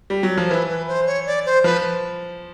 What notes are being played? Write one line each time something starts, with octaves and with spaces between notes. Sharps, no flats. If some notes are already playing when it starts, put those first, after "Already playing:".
G3
F#3
F3
E3 B4
B4
C5
C#5
D5
C5
F3 B4